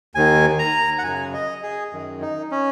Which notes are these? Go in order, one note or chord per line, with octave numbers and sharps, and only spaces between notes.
D#2 D#3 G#5
A#5
F#5
F#2 C#3 G#5
D#5
G#4
F#2 D#3
D#4
C#4